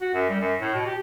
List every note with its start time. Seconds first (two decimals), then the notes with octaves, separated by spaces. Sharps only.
0.01 F#4
0.14 F#2
0.30 G3
0.41 F#2
0.61 A2
0.75 B2
0.86 G4